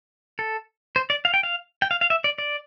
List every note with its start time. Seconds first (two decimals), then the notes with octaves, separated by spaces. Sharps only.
0.39 A4
0.96 C5
1.10 D5
1.25 F5
1.34 G5
1.43 F5
1.82 G5
1.91 F5
2.01 F5
2.10 E5
2.24 D5
2.38 D5